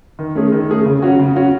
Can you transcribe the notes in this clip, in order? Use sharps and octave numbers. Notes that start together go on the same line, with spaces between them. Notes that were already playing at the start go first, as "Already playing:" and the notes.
D#3
A3 C#4 G#4
D#3
A3 C#4 G#4
C#3
F#3 C#4 F#4
C#3
F#3 C#4 F#4